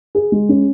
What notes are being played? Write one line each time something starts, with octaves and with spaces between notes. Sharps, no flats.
G#4
G#3
C#4